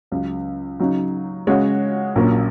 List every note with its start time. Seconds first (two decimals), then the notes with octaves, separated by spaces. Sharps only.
0.11 C#2 C#3 F#3
0.80 C#3 F#3 D#4
1.47 C#3 G#3 F#4 C#5
2.16 A#1 A#2 F#3 C#4 A#4